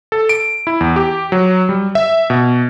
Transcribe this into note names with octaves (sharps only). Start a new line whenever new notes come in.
A4
D7
E4
E2
G4
F#3
G3
E5
B2